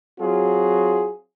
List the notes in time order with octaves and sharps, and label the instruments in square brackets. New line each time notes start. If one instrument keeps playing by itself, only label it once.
[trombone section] F#3 C4 F4 F#4 G#4